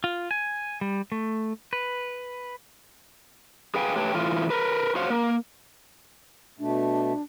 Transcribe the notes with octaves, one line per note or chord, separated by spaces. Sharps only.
F4
G#5
G3
A3
B4
G#4 B4 F5 G5 G#5
A3 G4 B4 C#5 G5 A5
A2 E3 F4
A#4 B4
F#4 C5 C#5 F5
A#3
B2 A3 D4